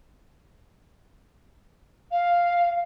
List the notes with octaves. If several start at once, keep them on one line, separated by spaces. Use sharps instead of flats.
F5